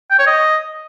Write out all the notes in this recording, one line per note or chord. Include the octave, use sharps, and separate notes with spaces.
G5
C#5
D#5